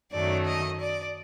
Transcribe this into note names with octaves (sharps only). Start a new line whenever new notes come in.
F#2 D#3 F#3 A3 D5
D#5
D5